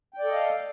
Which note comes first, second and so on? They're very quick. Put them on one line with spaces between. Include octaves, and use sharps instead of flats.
G5 D5 A4 D#5 F5